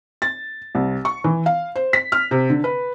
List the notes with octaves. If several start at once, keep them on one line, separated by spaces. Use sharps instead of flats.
A6
C2
C#6
E3
F5
C5
B6
F6
C3
D3
B4